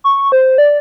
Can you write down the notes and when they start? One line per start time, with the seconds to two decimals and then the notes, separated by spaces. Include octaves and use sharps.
0.04 C#6
0.32 C5
0.58 D5